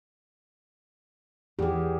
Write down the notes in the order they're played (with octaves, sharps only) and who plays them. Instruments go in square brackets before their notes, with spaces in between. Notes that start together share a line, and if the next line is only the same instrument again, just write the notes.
[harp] E2 [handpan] G4 G#4